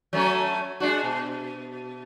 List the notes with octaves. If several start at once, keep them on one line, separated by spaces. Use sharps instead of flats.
F#3 A3 C#4
G#3 D4 F#4
B2